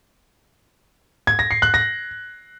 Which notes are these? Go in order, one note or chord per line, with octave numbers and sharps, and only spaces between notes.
G#6
A#6
C7
F#6
A#6